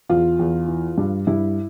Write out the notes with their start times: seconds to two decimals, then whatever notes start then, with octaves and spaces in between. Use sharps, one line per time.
0.09 E2 F4
0.39 E2
0.68 E3
0.98 G2
1.27 G2 E4